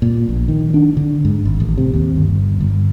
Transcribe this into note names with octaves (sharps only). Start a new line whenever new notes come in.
A#2
A#1
D#3
D4
D3
G#2
G#1
A1
C3
D#2
G1
G1